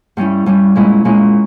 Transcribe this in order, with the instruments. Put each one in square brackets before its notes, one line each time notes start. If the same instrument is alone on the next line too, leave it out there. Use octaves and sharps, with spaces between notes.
[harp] G2 G3 C#4 E4
G2 G3 C#4 E4
A#2 G#3 C#4 E4
A#2 G#3 C#4 E4